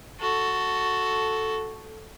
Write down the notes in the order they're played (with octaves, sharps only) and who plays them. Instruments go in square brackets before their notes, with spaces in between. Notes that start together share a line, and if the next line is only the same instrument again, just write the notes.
[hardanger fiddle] F#4 A4